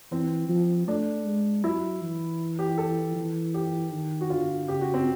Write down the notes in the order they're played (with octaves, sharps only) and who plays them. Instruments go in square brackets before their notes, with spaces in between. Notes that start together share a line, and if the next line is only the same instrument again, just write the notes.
[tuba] E3 [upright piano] C4
[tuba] F3
[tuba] A3 [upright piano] D4
[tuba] G#3
[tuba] F#3 [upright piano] E4
[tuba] E3
[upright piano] G4
A4
[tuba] E3
[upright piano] G4
[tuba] D#3
[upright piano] F#4
[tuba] D3 [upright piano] F4
[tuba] C#3 [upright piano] G4
[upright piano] F#4
C4